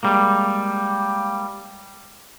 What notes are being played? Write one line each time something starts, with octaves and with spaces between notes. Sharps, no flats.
G3 G#3 A#3